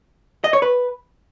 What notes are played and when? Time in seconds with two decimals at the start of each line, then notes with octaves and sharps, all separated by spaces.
0.44 D#5
0.53 C#5
0.62 B4